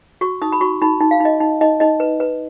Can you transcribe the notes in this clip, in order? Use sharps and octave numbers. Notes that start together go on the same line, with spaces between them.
F#4 C#6
D#4 D#6
B5
F#4 C#6
D#4 B5
D#4
F5
D#4
D#5
D#4
D#4 D#5
D#4 D#5
B4
B4